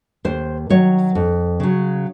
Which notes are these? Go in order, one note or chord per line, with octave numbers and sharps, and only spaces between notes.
D#2 C5
D#3 F#3 C#5
F2
C#3 F#3